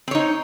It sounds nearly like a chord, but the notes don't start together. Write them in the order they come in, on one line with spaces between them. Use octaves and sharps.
C4 C#5 D#4